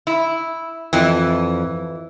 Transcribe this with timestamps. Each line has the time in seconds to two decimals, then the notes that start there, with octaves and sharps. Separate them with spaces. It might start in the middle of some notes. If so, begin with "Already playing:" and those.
0.07 E4
0.93 F2 E3